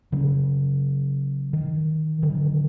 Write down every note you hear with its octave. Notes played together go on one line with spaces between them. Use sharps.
C#3 F#3
D#3
D3 D#3 F#3